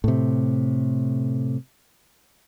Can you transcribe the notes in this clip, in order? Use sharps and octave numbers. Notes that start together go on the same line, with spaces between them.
A2 C3